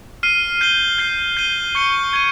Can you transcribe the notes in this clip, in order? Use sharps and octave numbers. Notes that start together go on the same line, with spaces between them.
F6 C7 D#7
G6 C7 G7
G6 C7 G7
G6 C7 D#7 G7
C#6 G6 C#7 G7
C#6 G#6 D#7 G7